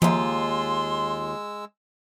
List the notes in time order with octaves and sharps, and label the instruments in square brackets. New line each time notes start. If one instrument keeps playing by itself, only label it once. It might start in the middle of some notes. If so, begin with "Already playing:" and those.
[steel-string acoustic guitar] D#2 F4 [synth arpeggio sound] F3 [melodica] G#3 E6 [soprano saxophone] C6